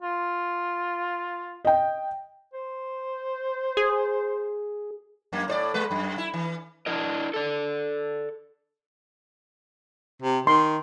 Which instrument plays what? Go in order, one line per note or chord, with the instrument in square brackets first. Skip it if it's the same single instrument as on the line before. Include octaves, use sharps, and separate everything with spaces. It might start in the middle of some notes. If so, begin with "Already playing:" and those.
[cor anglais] F4
[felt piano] D#5 G5
[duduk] C5
[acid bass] G#4
[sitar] F#2 A#3
A2 C5 D5
G#3 B4
F#2
E4
E3
[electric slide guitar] D4 E4 A#4 D#5
A4 D5
[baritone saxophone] C3
[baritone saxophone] D#3 [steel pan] C6